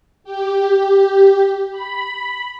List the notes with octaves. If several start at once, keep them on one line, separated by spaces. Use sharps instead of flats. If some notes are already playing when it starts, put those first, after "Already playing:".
G4
B5